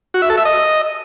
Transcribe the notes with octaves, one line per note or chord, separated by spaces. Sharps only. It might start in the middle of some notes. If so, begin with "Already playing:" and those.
F#4
E5
A4
E5
D#5